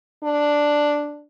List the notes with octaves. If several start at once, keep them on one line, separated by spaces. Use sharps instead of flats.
D4